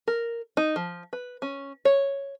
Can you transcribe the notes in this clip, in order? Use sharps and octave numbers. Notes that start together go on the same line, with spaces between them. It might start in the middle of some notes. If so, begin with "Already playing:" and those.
A#4
D#4
F3
B4
C#4
C#5